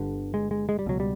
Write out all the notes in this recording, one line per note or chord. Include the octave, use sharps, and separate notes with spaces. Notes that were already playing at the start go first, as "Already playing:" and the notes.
Already playing: G1 G2 D3
G#3
G#3
G#3
G3
C#2 B2 F#3
G3